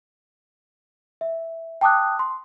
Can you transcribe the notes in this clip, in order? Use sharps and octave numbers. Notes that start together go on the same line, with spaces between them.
E5
G5 A5 D6 D#6 F#6
C6